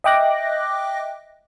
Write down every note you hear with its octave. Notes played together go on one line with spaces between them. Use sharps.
D#5 E5 G5 D6 F#6 A#6